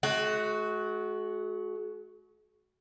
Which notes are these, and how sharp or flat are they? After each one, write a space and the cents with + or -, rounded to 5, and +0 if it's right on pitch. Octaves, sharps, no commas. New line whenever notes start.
G#3 +45 F#4 +0